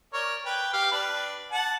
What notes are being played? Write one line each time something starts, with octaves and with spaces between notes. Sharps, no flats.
A#4 C#5 D5
B4 G5
G4 F5
D4 B4
F#5 A5